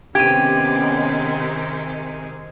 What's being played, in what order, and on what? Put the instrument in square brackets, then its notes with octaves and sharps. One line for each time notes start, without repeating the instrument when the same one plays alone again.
[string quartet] C3 D#3 G#3 [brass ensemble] B3 C#4 [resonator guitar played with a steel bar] G4 [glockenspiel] G#6 D#7